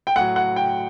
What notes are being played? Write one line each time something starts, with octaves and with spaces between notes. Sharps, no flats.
G5
A2 F#3 F#5
F#5
G5